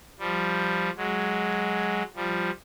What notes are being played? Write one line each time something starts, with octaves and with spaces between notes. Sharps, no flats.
F3 G3
F#3 G#3
F3 G3